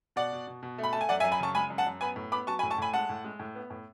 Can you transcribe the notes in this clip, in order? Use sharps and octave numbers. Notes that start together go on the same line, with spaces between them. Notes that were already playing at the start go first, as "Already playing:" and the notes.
B2 D5 F#5
B2
B2
B2
A3
B5
A3 A5
G#5
F#2 D5 F#5
E5 G#5
F#2
G#5 B5
C#3 A5 C#6
G#3 G#5 B5
F#2
F#5 A5
F#2
B3 G#5 B5
A2
B3 B5 D6
F#3 A5 C#6
G#5 B5
A2
A5 C#6
A2 G#5 B5
G#3 F#5 A5
A2
G#3
A2
B3
A2